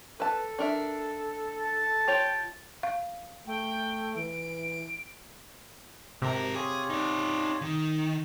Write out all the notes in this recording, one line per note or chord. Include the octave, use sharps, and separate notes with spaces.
A4 B4 A5
D4 A#4 E5
A5
F4 G4 C#5 G5
F5
A3 G5
E3 D7
G#2 C3 A#4
F4 G4 G#4 C#5
D#4 D5
D#3